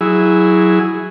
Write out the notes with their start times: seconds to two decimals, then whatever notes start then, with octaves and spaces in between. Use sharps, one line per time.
0.01 F#3 E4 G#4